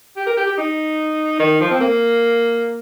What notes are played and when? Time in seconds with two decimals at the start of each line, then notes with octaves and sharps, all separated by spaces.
0.16 G4
0.27 A#4
0.37 G4
0.47 G4
0.58 D#4
1.39 D#3
1.61 F3
1.71 C4
1.80 A#3